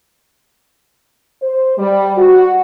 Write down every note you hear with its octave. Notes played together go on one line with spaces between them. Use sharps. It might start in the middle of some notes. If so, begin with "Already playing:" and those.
C5
G3
F#4